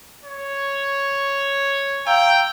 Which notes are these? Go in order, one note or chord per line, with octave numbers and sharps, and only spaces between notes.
C#5
F5 G5 A#5 E6